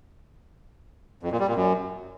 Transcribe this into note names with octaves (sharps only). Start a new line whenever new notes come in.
F2
A#2
G3
A#2
F#2